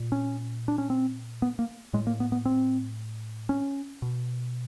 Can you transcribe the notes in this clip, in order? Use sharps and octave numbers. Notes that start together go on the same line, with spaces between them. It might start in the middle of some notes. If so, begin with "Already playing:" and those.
Already playing: A#2
C#4
D4
C#4
C4
B3
A#3
A2 G#3
A#3
B3
B3
C4
C#4
B2